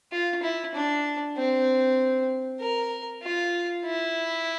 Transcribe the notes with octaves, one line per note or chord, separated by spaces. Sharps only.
F4
E4
D4
C4
A#4
F4
E4